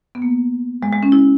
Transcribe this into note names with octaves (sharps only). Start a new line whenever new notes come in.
B3
A#3
G#3
G#3
C#4
E4